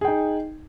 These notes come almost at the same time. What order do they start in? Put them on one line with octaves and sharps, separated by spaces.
G#4 G5 D#4